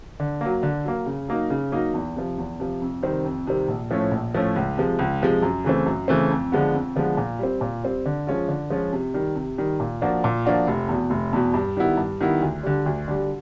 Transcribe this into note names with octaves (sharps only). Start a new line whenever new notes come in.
D3
F#3 A#3
D3
F#3 A#3
C#3
F#3 A#3 D#4
C#3
F#3 A#3 D#4
E2
C3 F3
E2
C3 F3
F2
C3 D#3 G3 C4
F2
C3 D#3 G3 C4
A#1
A2 F3 A3 C#4
A#1
A2 F3 A3 C#4
C#2
C3 F3 G#3
C#2
C3 F3 G#3
F#2
C#3 E3 A3 C4
F#2
C#3 E3 A3 C4
F2
D3 F3 G#3 B3
F2
D3 F3 G#3 B3
A#2
G3 C4
A#2
G3 C4
D3
F3 G#3 C#4 F4
D3
F3 G#3 C#4 F4
C3
D#3 G3
C3
D#3 G3
A#2
F3 A#3 D4 F#4
A#2
F3 A#3 D4 F#4
F1
E2 B2
F1
E2 B2
G2
D#3 G3 B3 E4
G2
D#3 G3 B3 E4
D2
D3 G3
D2
D3 G3